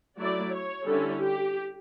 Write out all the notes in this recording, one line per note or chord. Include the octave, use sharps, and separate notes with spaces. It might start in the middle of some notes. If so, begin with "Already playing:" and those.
F#3 A3 E4 D5
C#5
D3 G3 C#4 E4 A4
G4